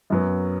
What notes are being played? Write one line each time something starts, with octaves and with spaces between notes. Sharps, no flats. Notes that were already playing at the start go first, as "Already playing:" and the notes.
F#2 F#3 B3